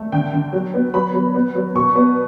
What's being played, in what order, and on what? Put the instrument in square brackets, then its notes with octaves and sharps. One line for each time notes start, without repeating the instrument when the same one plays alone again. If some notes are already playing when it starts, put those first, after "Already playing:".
Already playing: [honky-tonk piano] A3
D3 G5
D3
F#3
B3
F#3 B5
F#3
B3
F#3
B2 C#6
B3